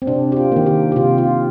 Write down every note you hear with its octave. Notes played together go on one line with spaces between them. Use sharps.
C4
C3 D4
G4
F4
D#3 A#3
G4
G4
C3 F4
F4